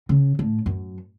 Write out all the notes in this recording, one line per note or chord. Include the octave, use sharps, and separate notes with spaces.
C#3
A2
F#2